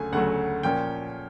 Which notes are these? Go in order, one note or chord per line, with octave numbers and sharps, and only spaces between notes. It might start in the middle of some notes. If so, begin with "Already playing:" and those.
Already playing: D2 C#3 F#3 A3 G#5
D2 C#3 F#3 A3 F#5
A#2 F3 A#3 C#4 G5